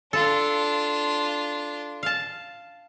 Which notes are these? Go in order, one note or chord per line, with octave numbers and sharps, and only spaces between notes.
D4 F4 A4
F5 A5